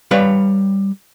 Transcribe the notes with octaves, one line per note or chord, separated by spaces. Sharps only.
G3 B4 C#5 F5